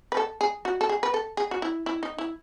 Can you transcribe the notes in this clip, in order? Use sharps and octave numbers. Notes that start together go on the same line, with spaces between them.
B4
A4
G#4
F#4
A4
G#4
B4
A4
G#4
F#4
E4
E4
D#4
E4